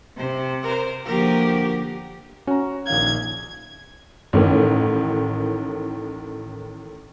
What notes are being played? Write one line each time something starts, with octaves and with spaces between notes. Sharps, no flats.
C3 C5
A#4 C5
D3 F3 A#3 F#4 G4 A#4
C#4 F#4 A#5
A#1 D#3 F5 G#6
A1 A2 D#3